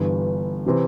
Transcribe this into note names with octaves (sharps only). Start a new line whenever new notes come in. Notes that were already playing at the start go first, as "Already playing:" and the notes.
Already playing: G1 G2 E3
C3 E3 C4